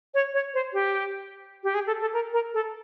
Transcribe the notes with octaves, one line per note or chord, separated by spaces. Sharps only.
C#5
C#5
C5
G4
G4
G#4
A4
A4
A#4
A#4
A4